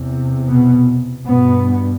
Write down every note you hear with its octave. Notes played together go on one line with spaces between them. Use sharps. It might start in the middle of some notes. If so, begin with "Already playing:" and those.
Already playing: E2 C3
B2 B3
G2 B2 B3